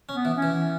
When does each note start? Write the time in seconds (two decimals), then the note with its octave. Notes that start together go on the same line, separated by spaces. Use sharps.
0.09 C#4
0.15 B3
0.25 E3
0.36 C#4
0.42 E3